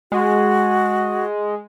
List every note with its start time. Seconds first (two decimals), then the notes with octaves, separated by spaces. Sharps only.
0.12 G#3 F#4